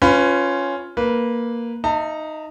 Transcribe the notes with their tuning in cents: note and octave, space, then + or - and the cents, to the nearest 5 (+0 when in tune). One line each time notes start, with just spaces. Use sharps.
C#4 +0 F4 +0 B4 +25
A#3 +0 B4 -10
D#4 +0 E5 +25 A5 +45